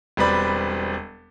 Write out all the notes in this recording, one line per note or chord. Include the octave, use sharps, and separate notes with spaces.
E1 G3 C4 B4 D5 B5